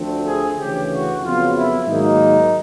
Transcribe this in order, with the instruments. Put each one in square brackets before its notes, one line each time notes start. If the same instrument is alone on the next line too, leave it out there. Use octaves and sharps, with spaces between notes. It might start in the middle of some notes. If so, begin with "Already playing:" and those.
Already playing: [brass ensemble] D2 D3 F3 A3 C4
G#4
D2 C#3 E3 G4
F#4
F2 C#3 F#3 B3 F4
E4
G#2 D#3 F#3 A#3 D#4